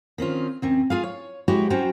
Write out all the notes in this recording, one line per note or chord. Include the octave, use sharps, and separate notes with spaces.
D#3 C4 C#4 F4
D#2 C4 C#4
F4 G#4 F5
C#5
G#3 E4 F#4 G4 C#5
F#3 C#4 F#4 C5 G5 A#5